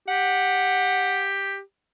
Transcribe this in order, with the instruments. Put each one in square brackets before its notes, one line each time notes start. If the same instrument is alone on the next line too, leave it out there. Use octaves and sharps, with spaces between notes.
[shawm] G4 [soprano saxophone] F#5